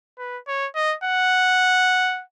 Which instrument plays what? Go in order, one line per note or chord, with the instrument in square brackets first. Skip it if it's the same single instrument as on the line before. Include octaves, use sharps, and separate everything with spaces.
[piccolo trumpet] B4
C#5
D#5
F#5